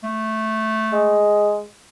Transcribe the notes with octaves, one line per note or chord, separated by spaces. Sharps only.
A3
G#3